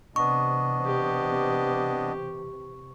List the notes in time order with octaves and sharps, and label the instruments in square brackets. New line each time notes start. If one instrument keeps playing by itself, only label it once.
[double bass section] C3 E3 [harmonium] B3 D4 D#5 [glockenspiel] C#6
[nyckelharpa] G4